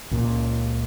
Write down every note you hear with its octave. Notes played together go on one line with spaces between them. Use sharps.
C#2 A#2 C#3